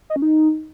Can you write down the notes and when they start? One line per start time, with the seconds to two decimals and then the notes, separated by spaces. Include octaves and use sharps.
0.10 D#5
0.16 C#4
0.22 D#4